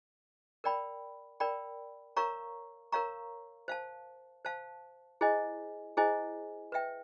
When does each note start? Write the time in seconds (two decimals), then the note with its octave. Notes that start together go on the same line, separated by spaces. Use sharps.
0.64 A#4 D5 G5 B5
1.40 A#4 D5 G5 B5
2.16 A#4 C#5 F5 A#5 C#6
2.92 A#4 C#5 F5 A#5 C#6
3.68 C5 F5 A5
4.45 C5 F5 A5
5.21 E4 G#4 C5 D#5 G#5
5.97 E4 G#4 C5 D#5 G#5
6.72 B4 E5 G5